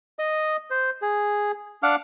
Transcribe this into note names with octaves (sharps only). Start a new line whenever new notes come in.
D#5 D#6
C5
G#4
D4 F5 F#5 D6 F6